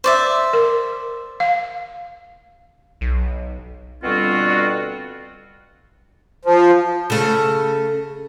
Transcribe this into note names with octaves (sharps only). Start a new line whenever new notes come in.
C5 D5 E5
A#4
F5
B1
B2 D3 G3 C4 F4 F#4
F3
C#3 A3